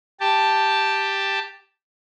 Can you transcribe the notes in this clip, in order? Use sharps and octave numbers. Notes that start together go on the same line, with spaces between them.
G4 A5